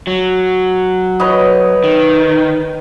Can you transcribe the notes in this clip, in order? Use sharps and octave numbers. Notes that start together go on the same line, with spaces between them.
F#3
B4 C#5 D#5
D#3